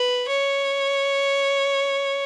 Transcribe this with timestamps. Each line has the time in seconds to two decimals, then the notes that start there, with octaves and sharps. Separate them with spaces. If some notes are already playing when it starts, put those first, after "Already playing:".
Already playing: B4
0.29 C#5